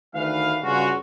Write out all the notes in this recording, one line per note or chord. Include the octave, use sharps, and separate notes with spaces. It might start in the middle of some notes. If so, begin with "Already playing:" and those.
D2 D#3 E3 B4 F5
G2 C#3 C#4 F4 F#4